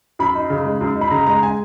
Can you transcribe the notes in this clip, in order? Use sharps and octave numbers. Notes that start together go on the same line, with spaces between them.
F#2 B5
D#4
C#3
G#3
F#2
D#4
B5
C#3 A#5
G#3 A#5
G#5